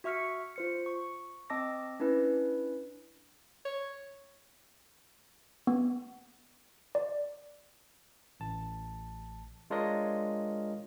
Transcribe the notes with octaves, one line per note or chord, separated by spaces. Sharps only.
F#4 E5 C#6 F6 B6 C#7
F4 C5 C#7
C#6
C4 D#5 A5 D6 E6 A#6
C#4 D4 E4 B4
C#5
B3
D5
A1 A5
G#3 D4 F4 A#4 C#5 D#5